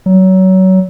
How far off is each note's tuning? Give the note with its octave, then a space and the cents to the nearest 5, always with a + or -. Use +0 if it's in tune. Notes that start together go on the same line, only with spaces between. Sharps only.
F#3 +25